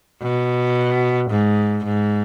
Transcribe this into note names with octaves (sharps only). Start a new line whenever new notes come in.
B2
G#2
G#2